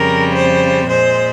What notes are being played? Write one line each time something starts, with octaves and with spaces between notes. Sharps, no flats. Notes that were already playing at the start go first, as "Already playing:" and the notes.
Already playing: F2 C#3 G3 A#4
C5
A#2 G#3 C5